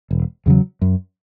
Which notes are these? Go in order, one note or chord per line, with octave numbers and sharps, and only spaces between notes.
E1
E2 C#3 F#3
F#2